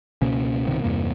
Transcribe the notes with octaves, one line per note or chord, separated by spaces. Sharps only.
C#2 B2 A#3 C#4
B1 G2 C3 D#3
E2 G2 C3 A#3